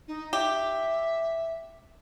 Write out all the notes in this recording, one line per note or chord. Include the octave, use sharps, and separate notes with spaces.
D#4
G4 E5